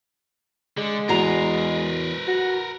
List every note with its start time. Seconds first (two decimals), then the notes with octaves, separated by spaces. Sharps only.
0.78 D3 G#3
1.09 E2 F#4 A#4 B4 A#5 C7
2.28 F#4 A#6